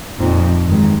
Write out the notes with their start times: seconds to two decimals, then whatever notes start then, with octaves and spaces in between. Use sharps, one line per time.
0.18 F2 A#2 F3 C4 D#4
0.67 G2 D#3 G#3